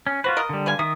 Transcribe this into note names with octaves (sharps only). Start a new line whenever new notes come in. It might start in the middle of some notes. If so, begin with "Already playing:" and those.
C#4
F4 F#4 B4 C5
A#4 D#5
D3 G3
B4 F5 G#5
D#3 D#4 E5 D#6